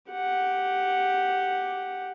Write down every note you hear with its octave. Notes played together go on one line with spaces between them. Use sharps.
G4 F#5